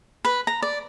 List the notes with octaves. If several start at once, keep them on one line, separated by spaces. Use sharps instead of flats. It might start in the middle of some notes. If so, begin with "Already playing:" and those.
B4
A#5
D5